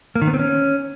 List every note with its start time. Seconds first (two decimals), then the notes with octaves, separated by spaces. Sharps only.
0.16 A#3
0.22 D#3
0.28 B3
0.34 C4
0.40 C#4